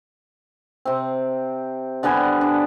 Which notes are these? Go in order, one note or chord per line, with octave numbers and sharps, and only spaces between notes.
C3 C4
D3 G3 B3 G#5
D4